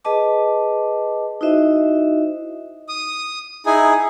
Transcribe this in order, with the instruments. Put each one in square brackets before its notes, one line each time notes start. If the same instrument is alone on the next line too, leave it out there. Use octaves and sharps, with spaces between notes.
[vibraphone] G#4 B4 D#5 A5 D6
D#4 E4 F#4 C5 D#5 E5
[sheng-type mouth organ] D#6
D#4 E4 G#4 G#5